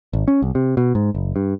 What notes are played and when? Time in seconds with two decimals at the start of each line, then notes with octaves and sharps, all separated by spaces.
0.13 G#1
0.28 C#4
0.42 C2
0.55 C3
0.77 B2
0.95 G#2
1.15 F#1
1.36 G2